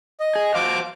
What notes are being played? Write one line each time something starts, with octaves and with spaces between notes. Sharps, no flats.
D#5
G#4
F#4 C5 F5 D6